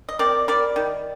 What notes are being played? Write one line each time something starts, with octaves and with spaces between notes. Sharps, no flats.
D#5
C4 A#4 D5
G3 A#4 D5
D#3